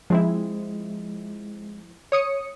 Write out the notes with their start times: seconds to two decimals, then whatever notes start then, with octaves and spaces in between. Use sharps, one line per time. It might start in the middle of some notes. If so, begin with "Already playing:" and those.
0.10 F3 G#3 C4 E4
2.12 C#5 D#6 C#7